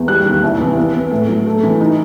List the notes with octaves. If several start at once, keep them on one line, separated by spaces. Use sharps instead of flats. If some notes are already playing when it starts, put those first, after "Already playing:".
Already playing: E2
G3 F#6
D#2
C2
E3
B3
B3
A2
F#3
A3
E3
D#4